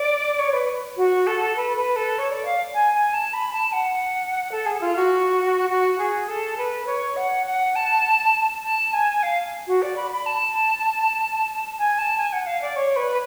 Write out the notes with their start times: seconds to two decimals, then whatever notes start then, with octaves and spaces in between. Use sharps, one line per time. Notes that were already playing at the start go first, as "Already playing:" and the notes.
Already playing: D5
0.39 C#5
0.53 B4
0.97 F#4
1.27 A4
1.56 B4
1.77 B4
1.96 A4
2.19 C#5
2.31 D5
2.45 F5
2.74 G#5
2.94 G#5
3.13 A5
3.33 B5
3.53 A5
3.73 F#5
4.52 A4
4.66 G#4
4.81 F4
4.96 F#4
5.70 F#4
5.99 G#4
6.28 A4
6.58 B4
6.87 C#5
7.17 F#5
7.46 F#5
7.76 A5
8.64 A5
8.93 G#5
9.23 F5
9.68 F#4
9.82 D5
9.96 B5
10.12 B5
10.26 A5
11.79 G#5
11.98 A5
12.18 G#5
12.33 F#5
12.47 F5
12.62 D5
12.76 C#5
12.96 B4